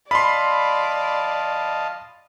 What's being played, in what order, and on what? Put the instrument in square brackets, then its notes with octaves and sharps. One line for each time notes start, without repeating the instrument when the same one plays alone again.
[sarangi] D5 [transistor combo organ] D#5 F5 A5 [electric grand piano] B5 C6